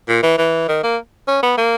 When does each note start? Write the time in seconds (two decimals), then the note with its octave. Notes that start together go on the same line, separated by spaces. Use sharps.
0.08 A#2
0.23 E3
0.38 E3
0.68 D#3
0.83 A#3
1.28 C#4
1.43 B3
1.57 A#3